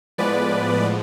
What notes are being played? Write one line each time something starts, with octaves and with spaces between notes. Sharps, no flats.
A2 F3 G#3 B3 B4 D5